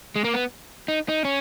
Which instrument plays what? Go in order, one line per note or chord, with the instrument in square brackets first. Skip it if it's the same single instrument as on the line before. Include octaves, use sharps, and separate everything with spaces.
[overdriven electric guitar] G#3
A#3
B3
D#4
D#4
C#4